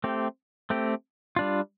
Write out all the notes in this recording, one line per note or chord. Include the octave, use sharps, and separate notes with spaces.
A3 C4 G4
A3 C4 G4
G3 D4 F4